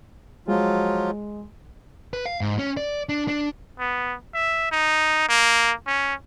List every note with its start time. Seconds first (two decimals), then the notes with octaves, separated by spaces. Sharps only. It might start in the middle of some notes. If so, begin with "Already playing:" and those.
0.48 F3 F#3 G#3 F4
2.13 B4
2.26 F5
2.41 G#2
2.59 C#4
2.77 D5
3.09 D4
3.28 D4
3.79 B3
4.34 E5
4.72 D#4
5.29 A#3
5.87 C#4